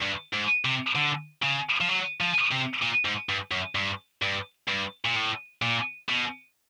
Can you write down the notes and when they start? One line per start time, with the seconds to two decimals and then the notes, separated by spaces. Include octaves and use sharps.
0.02 G2
0.33 G#2
0.65 C3
0.95 D3
1.43 C#3
1.81 F3
1.89 F#3
2.20 F3
2.51 C3
2.82 A#2
3.05 G#2
3.29 G2
3.51 F#2
3.75 G2
4.22 G2
4.68 G2
5.05 A#2
5.16 A2
5.62 A#2
6.09 B2